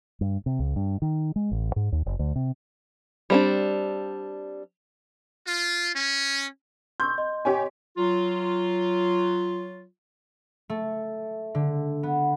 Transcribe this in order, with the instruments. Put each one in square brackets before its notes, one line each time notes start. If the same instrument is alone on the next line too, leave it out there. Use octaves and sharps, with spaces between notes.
[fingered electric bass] G2
C3
C#2
G2
D#3
G#3
A1
G#2
D#2
F#1
D2
C3
[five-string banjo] G3 C4 D4
[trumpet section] F4
C#4
[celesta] C6 C#6 E6 [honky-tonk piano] G6
[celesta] D#5 C6
[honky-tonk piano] G4 C#5 G#5
[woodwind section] F#3 F4
[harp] A3
D3
B3